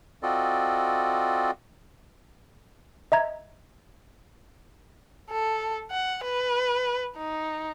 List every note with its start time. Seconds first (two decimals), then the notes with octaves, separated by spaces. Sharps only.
0.23 C4 F4 F#4 A4 D5 D#5
3.12 D#5 E5 A#5 G#6
5.30 A4
5.91 F#5
6.24 B4
7.17 D#4